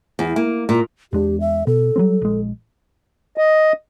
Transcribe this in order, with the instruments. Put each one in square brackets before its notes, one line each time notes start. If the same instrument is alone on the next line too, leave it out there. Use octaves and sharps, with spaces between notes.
[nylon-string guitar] E2
A#3
A#2
[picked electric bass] E2 G#3 D4 [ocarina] G4
[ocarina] E5
[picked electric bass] B2 [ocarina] A4
[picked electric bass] F#3 G3 C4
A#1 G#3
[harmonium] D#5